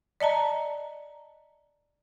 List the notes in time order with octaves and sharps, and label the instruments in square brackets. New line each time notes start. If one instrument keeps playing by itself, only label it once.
[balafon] D5 D#5 A5 A#5